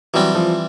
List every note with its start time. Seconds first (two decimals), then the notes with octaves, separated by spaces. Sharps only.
0.14 E3 F#3 G3 C4
0.35 F3